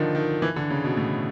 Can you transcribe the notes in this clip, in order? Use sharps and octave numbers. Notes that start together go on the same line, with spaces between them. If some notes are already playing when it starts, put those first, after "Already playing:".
Already playing: D3 D#3 F3
D#3
E3
D3
C#3
B2
A2